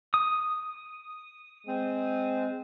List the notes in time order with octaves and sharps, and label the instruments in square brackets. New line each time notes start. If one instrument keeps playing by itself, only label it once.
[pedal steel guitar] D#6
[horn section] G#3 C4